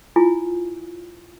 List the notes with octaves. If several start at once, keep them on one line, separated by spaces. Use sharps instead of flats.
E4 F4 G#5